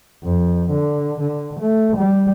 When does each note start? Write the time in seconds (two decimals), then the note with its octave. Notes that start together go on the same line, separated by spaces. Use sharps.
0.24 F2
0.71 D3
1.21 D3
1.60 A3
1.97 G3